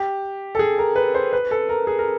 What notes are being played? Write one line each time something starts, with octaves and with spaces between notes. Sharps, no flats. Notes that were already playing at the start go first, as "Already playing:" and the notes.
Already playing: G4
A4
G#4
A#4
B4
C5
B4
A4
A#4
G#4
A#4